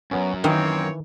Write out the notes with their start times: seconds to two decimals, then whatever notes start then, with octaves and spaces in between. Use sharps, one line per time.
0.11 F#2 F#3 B3 C#4
0.44 D#3 E3 A#3 C4 C#5